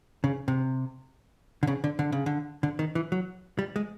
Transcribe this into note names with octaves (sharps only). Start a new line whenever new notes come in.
C#3
C3
D3
C#3
D3
D3
C#3
D3
D3
D#3
E3
F#3
G3
G#3